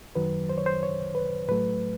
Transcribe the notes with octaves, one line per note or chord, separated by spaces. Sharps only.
F#2 D#3 F#3 B4
C5
C#5
C5
C#5
B4
A2 F#3 A3 B4